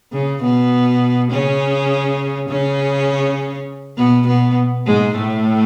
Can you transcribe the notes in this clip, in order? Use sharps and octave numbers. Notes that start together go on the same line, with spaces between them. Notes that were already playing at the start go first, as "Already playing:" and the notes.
C#3
B2 B3
C#3 C#4
C#3 C#4
B2 B3
B2 B3
G#2 G#3
A2 A3